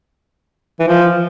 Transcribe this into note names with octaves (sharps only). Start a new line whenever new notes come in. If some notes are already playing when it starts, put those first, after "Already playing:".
E3
F3